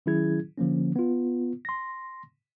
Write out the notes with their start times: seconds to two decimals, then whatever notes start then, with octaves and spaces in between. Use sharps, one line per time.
0.06 D#3 F#3 C#4 E4 G#4 G#6
0.58 D3 F3 A#3 C#4
0.96 B3 F4
1.65 C6 A#6